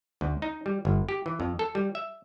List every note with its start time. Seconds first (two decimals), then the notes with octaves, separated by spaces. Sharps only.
0.21 D2
0.42 D#4
0.66 G3
0.85 G1
1.09 G4
1.26 E3
1.40 F2
1.59 A4
1.75 G3
1.95 E5